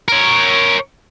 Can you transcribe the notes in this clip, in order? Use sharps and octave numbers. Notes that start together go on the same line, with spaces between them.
A#4 C#5